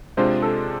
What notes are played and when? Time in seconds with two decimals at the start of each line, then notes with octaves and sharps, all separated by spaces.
0.17 C3 G#3 D4 F4 C5
0.42 A4